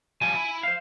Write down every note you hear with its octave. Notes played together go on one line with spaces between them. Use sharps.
F3 G3 G#5
E4 E5
C5 F5